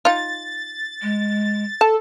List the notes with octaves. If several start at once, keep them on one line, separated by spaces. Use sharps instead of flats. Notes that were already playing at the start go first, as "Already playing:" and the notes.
D#4 F4 A6
G#3
A4 A5